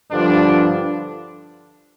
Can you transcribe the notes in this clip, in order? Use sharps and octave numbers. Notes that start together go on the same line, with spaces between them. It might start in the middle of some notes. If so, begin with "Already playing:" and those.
G2 D3 F3 D4